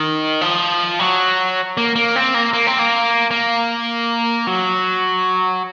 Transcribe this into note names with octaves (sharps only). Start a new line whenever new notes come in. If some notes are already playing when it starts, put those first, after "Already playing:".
Already playing: D#3
F3
F#3
A#3
A#3
C4
A#3
A#3
C4
A#3
A#3
F#3